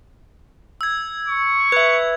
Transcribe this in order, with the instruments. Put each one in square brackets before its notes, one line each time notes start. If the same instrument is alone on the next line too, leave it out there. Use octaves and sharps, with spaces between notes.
[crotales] E6 G#6
[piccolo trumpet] C#6
[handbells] B4 E5 [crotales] G#6